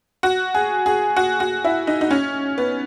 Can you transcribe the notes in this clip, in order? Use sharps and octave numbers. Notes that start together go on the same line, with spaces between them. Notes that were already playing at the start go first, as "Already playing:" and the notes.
F#4
G#4
G#4
F#4
F#4
E4
D#4
D#4
C#4
B3